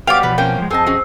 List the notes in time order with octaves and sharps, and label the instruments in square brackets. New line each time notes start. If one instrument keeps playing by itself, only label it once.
[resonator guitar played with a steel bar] F#3 G3 B3 [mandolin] F5 D6 [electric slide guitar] G5
[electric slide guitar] B2 F3 [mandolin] B4
[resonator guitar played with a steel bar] A#3 C4 C#4 [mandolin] G5
[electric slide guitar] F3 G#3
[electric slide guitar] F2 D#5 [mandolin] C4 [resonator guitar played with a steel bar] G#4 A4 A5
[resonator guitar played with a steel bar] C#4 F#4 G#4